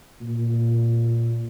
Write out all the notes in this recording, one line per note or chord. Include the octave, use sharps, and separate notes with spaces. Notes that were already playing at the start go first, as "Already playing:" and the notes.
A#2